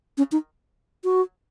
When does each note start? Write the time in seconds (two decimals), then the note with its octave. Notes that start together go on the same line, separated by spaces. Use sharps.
0.18 C#4
0.32 D#4
1.04 F#4